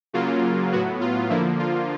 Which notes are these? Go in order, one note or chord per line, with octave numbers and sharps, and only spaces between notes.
C#3 F#3 A#3 F4
A2 F#3 B3 F#4
F4
D3 F3 A#3 E4
F4